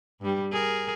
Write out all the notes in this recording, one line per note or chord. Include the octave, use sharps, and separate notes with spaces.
G2 G3
G#4 A#4